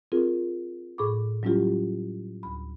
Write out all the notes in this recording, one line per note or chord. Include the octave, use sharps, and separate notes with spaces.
C4 F4 G#4 A#4
A2 G#4 B5 C#6 D6
F#3 G3 C#4 E4 F4 G4
D2 B5